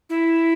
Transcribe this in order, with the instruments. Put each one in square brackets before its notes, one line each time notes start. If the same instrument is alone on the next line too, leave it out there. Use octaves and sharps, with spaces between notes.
[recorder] E4